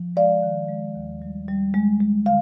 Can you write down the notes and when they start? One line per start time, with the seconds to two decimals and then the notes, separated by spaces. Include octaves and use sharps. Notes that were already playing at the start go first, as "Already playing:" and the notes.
Already playing: F3
0.16 G#3 D5 F5
0.43 D#3
0.68 G#3
0.95 D#2
1.22 G3
1.48 G3
1.74 G#3
2.00 G#3
2.26 D3 F5